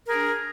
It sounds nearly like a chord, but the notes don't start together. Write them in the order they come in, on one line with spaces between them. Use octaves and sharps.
A#4 G#4 D4